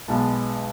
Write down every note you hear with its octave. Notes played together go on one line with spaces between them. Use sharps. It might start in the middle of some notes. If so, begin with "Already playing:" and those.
B1 B2 G#3 B3 A5